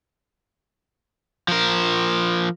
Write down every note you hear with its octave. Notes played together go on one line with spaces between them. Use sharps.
F3 A#4